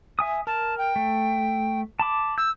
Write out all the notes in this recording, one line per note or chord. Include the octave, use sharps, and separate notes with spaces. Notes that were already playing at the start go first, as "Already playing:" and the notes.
E5 G#5 D#6
A#4 A5
G5
A3
A5 B5 D6
E6 G6